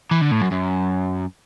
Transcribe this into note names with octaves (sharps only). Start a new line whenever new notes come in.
E3
D3
A2
F#2
F#2